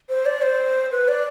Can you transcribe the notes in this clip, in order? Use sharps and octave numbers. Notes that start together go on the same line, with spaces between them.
C5
D5
C5
B4
D5